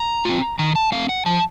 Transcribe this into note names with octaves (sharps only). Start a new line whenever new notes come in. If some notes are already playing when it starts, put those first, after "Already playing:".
Already playing: A#5
C4 F4
D#3 A#5
A5
A3 C4 F5
F#5
F3 A5